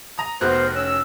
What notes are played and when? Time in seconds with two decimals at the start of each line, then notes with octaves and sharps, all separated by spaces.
0.18 A#5 D#6
0.41 F1 B3 F#4 A#4 C5 F#6
0.75 C#4 E6